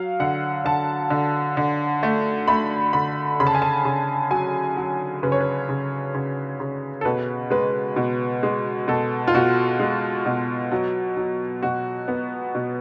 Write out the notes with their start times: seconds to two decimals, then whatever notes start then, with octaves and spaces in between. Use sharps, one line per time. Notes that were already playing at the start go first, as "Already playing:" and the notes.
Already playing: F#3 F5
0.20 D3 F#5
0.65 D3 A5
1.10 D3
1.57 D3
2.03 A3
2.48 A3 B5
2.93 D3 B5
3.40 C#3 B5
3.47 A5
3.55 G#5
3.62 A5
3.85 C#3
4.30 F#3 G#5
4.77 F#3
5.23 C#3 B4
5.32 C#5
5.41 B4
5.69 C#3
6.14 C#3
6.60 C#3
7.01 A4
7.05 B2 B4
7.50 G#3 B4
7.96 B2
8.43 G#3
8.88 B2 A4
9.28 F4
9.34 B2 F#4
9.79 G#3
10.26 B2
10.72 F#3
11.17 F#3
11.63 B2 F#4
12.08 B3
12.55 B2